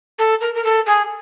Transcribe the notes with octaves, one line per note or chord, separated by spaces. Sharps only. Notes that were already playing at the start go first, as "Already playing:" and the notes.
A4
A#4
A#4
A4
G#4